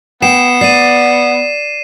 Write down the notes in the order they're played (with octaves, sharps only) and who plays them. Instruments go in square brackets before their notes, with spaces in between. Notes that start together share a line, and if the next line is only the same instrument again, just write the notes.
[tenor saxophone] B3 [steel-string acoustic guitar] G5 [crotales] C7 E7
[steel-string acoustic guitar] D5 [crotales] C7 D#7